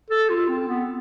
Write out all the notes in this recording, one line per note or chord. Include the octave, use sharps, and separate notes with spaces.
A4
F4
C4
B3